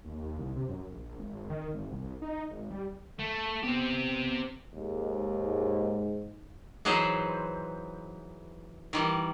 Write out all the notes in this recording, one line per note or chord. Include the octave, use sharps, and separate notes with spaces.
D#2
C2
C3
F#2
A#1
G#1
D#3
G#1
C2
D#4
G#1
G3
A3
B3 C4 G4
D#2 G#2
E3 F#3 D#4 G#4 B4 C5
D#3 E3 G3